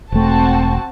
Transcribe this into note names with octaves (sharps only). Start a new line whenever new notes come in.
E1 A3 C4 F#4 A5